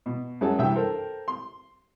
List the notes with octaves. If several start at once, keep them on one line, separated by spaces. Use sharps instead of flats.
B2
F#2 G#3 C#4 F#4 A5
C2 G2 E3 E5 G5 E6
A4 A#4 C5 G5
C6